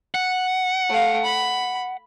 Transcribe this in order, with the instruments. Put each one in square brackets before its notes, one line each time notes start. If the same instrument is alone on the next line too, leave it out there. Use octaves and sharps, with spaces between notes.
[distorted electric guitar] F#5
[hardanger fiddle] A3 F5
B5